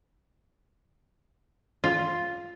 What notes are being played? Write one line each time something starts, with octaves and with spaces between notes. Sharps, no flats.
F4